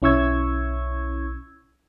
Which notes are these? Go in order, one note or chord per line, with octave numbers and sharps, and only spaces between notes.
B1 C#4 E4 C#6 E6 G#6